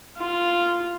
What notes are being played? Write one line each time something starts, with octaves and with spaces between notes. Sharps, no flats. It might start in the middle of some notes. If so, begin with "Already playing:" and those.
F4